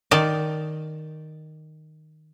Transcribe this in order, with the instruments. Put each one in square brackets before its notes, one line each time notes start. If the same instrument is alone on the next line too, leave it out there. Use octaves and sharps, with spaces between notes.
[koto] D#3 D5 A5